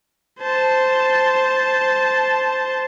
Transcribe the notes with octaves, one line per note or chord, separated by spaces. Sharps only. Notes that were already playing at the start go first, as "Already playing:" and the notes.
C5 A5